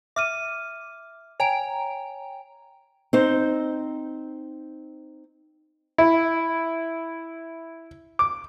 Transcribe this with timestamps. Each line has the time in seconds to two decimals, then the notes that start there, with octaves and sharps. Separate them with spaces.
0.16 E5 D6 F6 D#7
1.40 C#5 G5 G#5 A#5 D7
3.13 C4 D#4 C5
5.98 E4
8.19 D6